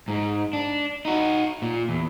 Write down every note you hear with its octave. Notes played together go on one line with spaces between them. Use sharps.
G#2
D4
D#4 F#4
A#2
E2